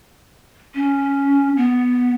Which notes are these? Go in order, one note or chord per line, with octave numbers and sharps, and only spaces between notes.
C#4
B3